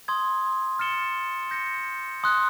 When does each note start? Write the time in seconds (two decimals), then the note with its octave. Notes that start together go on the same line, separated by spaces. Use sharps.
0.08 C6 D#6 G#6
0.79 F6 A6 C#7 E7 G7
1.51 G6 A#6 C#7
2.24 C6 D#6 F#6